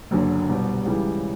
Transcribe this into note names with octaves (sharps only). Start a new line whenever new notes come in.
F#1 F#2 D3
C2 B2 G3
C#2 C#3 E3 G3